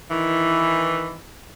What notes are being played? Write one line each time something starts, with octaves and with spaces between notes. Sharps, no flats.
D#3 E3